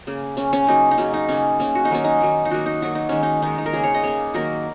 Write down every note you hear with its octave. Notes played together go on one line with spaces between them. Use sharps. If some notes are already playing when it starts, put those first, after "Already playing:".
C#3 A#3
C#3 A#3 C#4
C#4
C#3 F#3 A#3 D#4
D#4
C#3 F#3 A#3 C#4
D#4
C#3 A#3 C#4
C#3 A#3 C#4
F#4
D#4
D#3 F#3 A#3 C#4
D#4
D#3 F#3 A#3
D#4
D#3 F#3 A#3 F#4
D#4
D#3 F#3 A#3 F#4
D#4
D#3 G#3 C#4
D#4
D#3 G#3 D#4
D#4
A#4
C#3 A#3 G#4
C#5
D#5
C#3 A#3 C#5
D#3 F#3 A#3 A#4